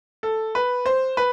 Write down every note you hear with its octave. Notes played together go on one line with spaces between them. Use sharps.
A4
B4
C5
B4